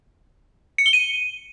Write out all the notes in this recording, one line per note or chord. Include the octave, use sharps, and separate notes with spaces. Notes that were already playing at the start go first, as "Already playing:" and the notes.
C#7
G7
D#7